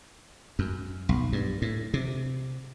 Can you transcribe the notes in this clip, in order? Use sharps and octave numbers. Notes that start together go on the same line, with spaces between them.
F#2
B1
G2
A2
C3